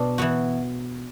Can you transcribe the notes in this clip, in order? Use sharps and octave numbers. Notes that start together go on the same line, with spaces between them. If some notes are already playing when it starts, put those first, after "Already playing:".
Already playing: B2 D4
E3 B3 F#4